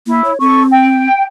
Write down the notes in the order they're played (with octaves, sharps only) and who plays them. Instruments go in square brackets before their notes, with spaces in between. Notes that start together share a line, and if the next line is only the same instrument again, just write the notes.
[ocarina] A#3 [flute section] E4
[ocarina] C#5
[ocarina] C4 [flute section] A4 C#6
[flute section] G5